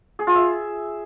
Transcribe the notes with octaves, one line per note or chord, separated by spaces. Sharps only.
G#4
F4
E5